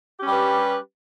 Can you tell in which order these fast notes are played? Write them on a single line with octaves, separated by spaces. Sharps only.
G4 C#4 G3 B4